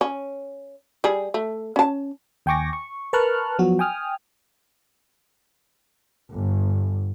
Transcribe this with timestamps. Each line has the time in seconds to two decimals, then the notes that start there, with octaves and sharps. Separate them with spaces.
0.01 C#4
1.04 G3 G#4
1.34 A3
1.76 C#4 A5
2.46 D#2 G5 G#5 C#6 D6 A#6
2.73 C#6
3.13 A#4 B4 A5 C#6 F6 F#6
3.59 F3 F#3 B3 F#4
3.79 G5 G#5 D#6 F6
6.31 G1